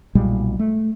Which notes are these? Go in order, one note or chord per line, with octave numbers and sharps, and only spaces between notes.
B1 A#2 G3 G#3
A3